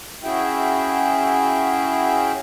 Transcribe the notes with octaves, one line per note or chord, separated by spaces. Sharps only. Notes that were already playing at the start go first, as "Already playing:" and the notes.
C#4 E4 F#4 G#4 E5 G5